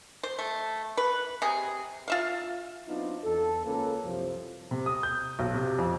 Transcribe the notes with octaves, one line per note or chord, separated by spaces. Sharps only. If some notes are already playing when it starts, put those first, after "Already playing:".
C5
A3
B4
C3 G#4
F4 E5 F5
F#3 B3 C4 D4 D#4 F4
E2 A4
C#2 A#3 C#4 A4 B4
C2 F#2 C3 F3
C3
D#6
G6
B1
C3
F2